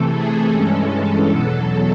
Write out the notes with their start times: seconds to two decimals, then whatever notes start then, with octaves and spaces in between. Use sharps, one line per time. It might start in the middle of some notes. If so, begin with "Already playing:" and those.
Already playing: C3 E3 A3 A4
0.12 G#4
0.50 G2 E3 G#3 C#4 A4
1.27 E2 B2 F#3 A4